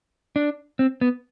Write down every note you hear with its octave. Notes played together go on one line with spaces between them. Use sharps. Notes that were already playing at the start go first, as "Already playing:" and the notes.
D4
C4
B3